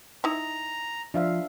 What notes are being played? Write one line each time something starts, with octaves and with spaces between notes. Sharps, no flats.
D#4 E4 A#5
F3 D4 E5 F5